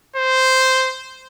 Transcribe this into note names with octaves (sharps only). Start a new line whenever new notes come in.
C5